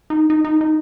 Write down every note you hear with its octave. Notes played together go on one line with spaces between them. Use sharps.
D#4
D#4
D#4
D#4